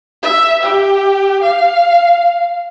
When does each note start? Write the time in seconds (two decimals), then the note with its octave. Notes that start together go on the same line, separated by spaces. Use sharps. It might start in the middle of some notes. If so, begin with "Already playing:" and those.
0.22 E5
0.62 G4
1.42 F5